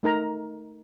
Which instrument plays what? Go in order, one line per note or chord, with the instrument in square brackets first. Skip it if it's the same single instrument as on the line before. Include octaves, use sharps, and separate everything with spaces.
[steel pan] A3 D#4 A#4 A#5